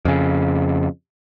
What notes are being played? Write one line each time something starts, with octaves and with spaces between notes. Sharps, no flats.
F2 C#3